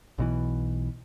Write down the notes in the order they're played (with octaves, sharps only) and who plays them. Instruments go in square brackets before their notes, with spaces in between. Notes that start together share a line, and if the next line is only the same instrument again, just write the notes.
[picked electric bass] B1 B2 E3